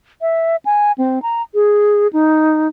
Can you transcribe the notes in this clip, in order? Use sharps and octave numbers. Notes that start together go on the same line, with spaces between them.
E5
G#5
C4
A#5
G#4
D#4